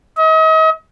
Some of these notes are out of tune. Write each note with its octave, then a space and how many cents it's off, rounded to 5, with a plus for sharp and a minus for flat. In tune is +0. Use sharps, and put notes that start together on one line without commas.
D#5 +40